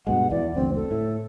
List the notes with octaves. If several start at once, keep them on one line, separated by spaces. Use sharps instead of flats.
G2 B2 G#3 F#5
E2 E3 D5
F#1 D2 C4
A4
A2